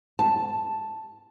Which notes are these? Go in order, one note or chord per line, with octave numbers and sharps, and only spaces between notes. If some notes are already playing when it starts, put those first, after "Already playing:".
A5